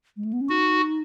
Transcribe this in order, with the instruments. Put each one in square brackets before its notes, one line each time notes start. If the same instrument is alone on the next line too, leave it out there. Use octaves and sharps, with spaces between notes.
[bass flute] G#3
A3
B3
C#4
[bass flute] D#4 [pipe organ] F#4